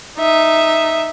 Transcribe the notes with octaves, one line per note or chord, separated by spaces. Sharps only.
D#4 E5